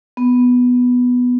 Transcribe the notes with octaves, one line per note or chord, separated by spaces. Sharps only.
B3